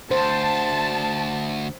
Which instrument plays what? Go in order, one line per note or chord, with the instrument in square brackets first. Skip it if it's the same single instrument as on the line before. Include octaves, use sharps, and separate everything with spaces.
[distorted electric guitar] D2 [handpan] C5 [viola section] A5